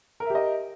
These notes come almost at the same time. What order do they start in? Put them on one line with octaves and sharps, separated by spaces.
A#4 E5 G4 D#5